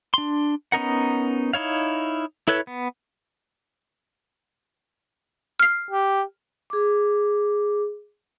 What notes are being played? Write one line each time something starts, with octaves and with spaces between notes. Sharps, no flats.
D4 C6
B3 C#4 D#4 A#4 F#5
D#4 E4 C#5 F5
E4 A4 B4 C#5
B3
F6 C7
G4
G#4 D6